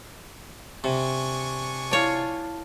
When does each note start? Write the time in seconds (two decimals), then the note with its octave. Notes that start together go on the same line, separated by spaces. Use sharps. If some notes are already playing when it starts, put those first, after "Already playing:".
0.84 C3 D4 G#5 C#6
1.91 E4 F4 C#5 D5 A5